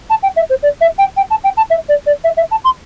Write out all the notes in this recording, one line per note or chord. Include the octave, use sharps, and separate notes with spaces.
A5
G5
E5
C5
D5
E5
G5
G5
A5
G5
A5
E5
D5
D5
E5
E5
A5
C6